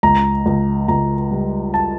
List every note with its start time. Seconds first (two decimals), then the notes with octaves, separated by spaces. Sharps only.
0.03 C#2 A#5
0.46 C#2
0.88 C#2 A#5
1.31 G3
1.74 A5